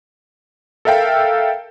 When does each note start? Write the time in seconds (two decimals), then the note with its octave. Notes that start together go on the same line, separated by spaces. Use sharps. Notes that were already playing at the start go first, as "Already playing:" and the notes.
0.85 A4 A#4 E5 F5 G5